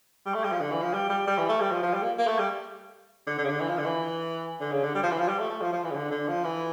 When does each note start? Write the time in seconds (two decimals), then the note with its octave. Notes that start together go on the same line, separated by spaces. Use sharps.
0.26 G3
0.34 A3
0.44 G3
0.52 F3
0.61 D3
0.71 E3
0.82 F3
0.93 G3
1.10 G3
1.27 G3
1.38 E3
1.49 A3
1.60 G3
1.72 F3
1.83 F3
1.94 G3
2.02 A#3
2.19 A#3
2.27 A3
2.39 G3
3.27 D3
3.38 D3
3.44 C#3
3.49 D3
3.60 E3
3.69 F3
3.78 D3
3.85 E3
4.61 D3
4.71 C#3
4.84 D3
4.95 G3
5.03 F3
5.11 E3
5.18 F3
5.28 G3
5.39 A3
5.50 A3
5.61 F3
5.73 F3
5.84 E3
5.90 C#3
5.95 D3
6.11 D3
6.28 F3
6.44 E3